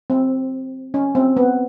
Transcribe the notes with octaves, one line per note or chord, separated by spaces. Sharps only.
C4
C#4
C4
B3